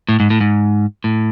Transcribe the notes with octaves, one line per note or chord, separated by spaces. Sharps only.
A2
G#2
A2
G#2
A2